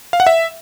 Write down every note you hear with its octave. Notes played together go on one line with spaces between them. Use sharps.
F5
F#5
E5